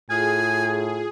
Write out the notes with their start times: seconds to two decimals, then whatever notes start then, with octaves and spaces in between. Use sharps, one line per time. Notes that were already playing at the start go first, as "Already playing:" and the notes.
0.10 A2 F4 G#4 G#5